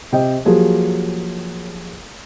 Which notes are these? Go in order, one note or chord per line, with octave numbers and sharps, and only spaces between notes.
C3 D#5 G5
F3 F#3 A#3 G4 G#4